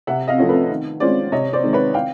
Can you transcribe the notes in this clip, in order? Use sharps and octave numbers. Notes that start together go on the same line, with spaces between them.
C3 E5 F#5
D#5 F5
F3 A3 C#4 F4
A4 B4
D#3
G#3 C#4 F4 C5 D5
C3 C#5 D#5
C5 D5
D#3 G#3 C4
B4 C#5
F5 G5